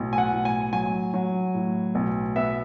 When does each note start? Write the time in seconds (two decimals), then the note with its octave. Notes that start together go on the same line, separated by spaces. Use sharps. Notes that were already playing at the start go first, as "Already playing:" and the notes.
Already playing: B1 A2
0.13 G#5
0.18 F#5
0.32 A2
0.45 G#5
0.73 F#3 G#5
1.14 F#3
1.54 A2
1.95 B1
2.36 B3 E5